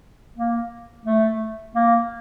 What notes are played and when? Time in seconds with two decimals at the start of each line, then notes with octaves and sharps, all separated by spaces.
0.36 A#3
1.05 A3
1.75 A#3